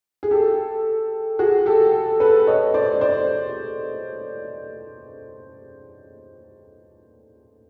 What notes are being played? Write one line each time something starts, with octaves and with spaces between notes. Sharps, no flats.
G#4
G4 A4
F#4 G#4
G4 A4
A4 B4
C#5 D#5
C5 D5
C5 D5